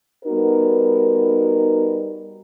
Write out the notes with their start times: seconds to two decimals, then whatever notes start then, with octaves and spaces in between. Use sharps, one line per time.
0.24 G3 B3 D#4 F#4 A#4